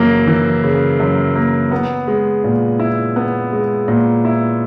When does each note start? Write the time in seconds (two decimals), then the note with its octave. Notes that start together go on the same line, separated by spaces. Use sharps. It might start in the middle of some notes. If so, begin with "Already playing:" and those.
Already playing: F#2 C#3 E3 A#3
0.27 E3
0.64 C#3
1.00 F#2
1.36 A#3
1.71 B3
2.08 G#3
2.44 A#2
2.79 E4
3.16 B3
3.53 G#3
3.88 A#2
4.25 E4